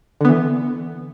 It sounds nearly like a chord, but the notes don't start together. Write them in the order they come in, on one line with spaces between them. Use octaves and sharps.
D3 B3 E3